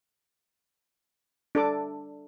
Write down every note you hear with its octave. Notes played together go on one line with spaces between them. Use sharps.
D4 A4 D6